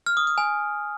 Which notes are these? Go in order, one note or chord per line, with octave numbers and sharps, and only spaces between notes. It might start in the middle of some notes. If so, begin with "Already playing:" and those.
F6
D#6
D#6
G#5